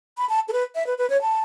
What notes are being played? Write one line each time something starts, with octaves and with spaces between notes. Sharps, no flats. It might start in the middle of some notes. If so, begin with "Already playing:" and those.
B5
A5
A4
B4
E5
B4
B4
C#5
A5